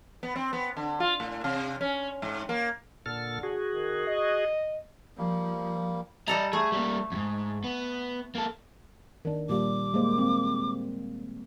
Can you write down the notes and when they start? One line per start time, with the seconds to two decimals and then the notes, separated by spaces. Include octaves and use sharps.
0.23 B3
0.36 C4
0.53 B3
0.77 D3
1.00 F4
1.20 A2
1.44 C3
1.81 C#4
2.22 G#2
2.49 A#3
3.06 A#2 D3 A4 F6
3.43 F#4 G#4
3.73 D#3
4.07 D#5
5.18 F3 G3 A#3
6.28 G3 A4 D5 D#5 A#5
6.53 A3 G#4
6.72 G3 A#3
7.12 F2 G#2
7.64 B3
8.35 A#3 A4
9.25 D#3 D4
9.49 A#2 G3 D6
9.94 G#3 A#3 C5
10.18 C4